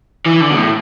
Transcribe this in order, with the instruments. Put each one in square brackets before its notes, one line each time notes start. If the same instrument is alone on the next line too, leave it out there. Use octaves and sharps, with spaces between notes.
[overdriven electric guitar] E3
D3
B2
A2